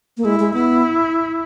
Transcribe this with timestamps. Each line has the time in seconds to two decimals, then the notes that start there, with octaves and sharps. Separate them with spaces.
0.17 A#3
0.25 G#3 E4
0.40 G#3
0.53 B3 E4